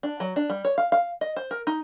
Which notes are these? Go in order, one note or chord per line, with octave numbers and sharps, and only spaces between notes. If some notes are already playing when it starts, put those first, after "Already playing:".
D4
F#3
D4
G3
C#5
F5
F5
D#5
C5
A#4
D#4